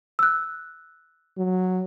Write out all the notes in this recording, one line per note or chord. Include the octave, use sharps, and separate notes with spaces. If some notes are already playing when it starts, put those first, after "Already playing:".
E6 F#6
F#3